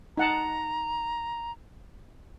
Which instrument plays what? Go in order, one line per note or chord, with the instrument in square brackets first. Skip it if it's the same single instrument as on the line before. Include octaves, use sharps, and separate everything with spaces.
[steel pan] D#4 F#5 A5 [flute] A#5